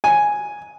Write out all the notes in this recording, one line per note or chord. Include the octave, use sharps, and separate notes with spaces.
G#5